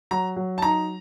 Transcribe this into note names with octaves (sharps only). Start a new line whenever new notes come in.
F#3 A#5
F#3
A5
D#4 A#5